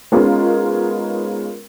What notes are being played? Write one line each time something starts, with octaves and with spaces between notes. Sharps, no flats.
G#3 B3 C#4 D#4 F4 A#4